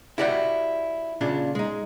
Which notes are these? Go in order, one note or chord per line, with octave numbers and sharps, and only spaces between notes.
E4 F#4 G4 D5 F5 F#5
A#2 C#3 D4 F4
G#3 D#4